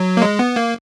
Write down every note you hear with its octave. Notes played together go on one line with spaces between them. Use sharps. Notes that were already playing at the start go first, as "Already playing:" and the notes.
Already playing: F#3
A#3
G#3
B3
A#3